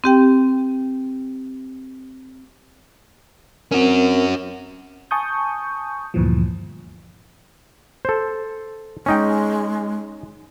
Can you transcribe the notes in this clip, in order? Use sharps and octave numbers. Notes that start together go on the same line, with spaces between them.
C4 G4 G5
C4 C#4 F#4 A#4
G#5 A5 C#6 D#6 G6
D2 G2 A#2 E3 F3
A4 C5
G#3 C#4 D#4 G5